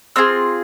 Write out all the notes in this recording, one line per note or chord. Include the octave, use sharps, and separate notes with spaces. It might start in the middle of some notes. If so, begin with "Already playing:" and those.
C4 F4 G#4 E6